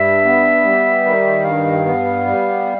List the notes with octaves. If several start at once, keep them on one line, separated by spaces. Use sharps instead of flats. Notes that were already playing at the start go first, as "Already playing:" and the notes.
Already playing: G2 E5
B3
G3
D#3
G2 F5
B3
G3